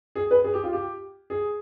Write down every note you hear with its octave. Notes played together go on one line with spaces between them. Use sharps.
G#4
B4
G#4
G4
F4
G4
G#4